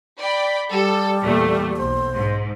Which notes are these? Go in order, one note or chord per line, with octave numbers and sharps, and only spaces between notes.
D5 G5 B5
G3 A4
E2 A#2 A3
B1 C5
G#2